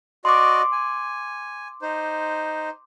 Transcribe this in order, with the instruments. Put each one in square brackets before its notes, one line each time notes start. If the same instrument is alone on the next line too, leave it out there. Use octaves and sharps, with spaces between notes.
[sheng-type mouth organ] F#4 D5 D#5 [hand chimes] C6 D6
[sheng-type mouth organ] G#5
D#4 C5